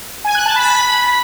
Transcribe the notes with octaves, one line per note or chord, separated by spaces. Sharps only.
G#5
F#6
A5
B5